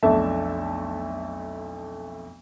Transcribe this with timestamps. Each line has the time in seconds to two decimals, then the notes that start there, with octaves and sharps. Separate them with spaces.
0.03 B1 F2 A3 D4 E5 A5